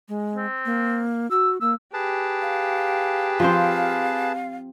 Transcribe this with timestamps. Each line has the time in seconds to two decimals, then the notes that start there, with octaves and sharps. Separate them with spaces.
0.09 G#3
0.35 C4
0.66 A#3
1.31 F#4 E6
1.61 A#3 E6
1.94 G4 G#4 B4 A5
2.42 F5
3.40 F3 C4 C5 F5